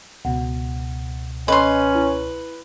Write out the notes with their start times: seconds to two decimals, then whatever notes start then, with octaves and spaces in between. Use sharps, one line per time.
0.25 C#2 B2 F#5
1.48 C#4 B4 D#5 C6
1.95 E4